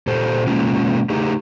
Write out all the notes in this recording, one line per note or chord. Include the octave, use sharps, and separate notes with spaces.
A#2 G4 A4 C5
B2 G#3 A#3 C#4 F4
A3 D#4 G4 G#4